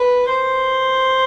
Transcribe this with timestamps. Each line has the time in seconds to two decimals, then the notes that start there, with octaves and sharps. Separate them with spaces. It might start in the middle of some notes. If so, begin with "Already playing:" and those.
Already playing: B4
0.29 C5